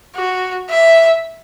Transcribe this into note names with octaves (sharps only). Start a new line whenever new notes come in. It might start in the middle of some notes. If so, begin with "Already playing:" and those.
F#4
E5